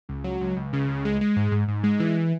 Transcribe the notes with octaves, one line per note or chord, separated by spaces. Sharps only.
C#2
F#3
C#2
C#2
C#3
C#2
G#3
G#3
G#2
G#2
G#2
G#3
E3